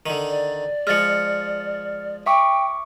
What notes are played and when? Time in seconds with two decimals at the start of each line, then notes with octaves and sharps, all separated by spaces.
0.06 D3 D#3
0.30 D5
0.87 F3 G#3 F6 A6 C#7
2.26 E5 G5 C#6 D6